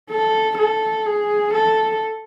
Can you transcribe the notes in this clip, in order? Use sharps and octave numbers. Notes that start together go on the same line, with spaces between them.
A4
A4
G#4
A4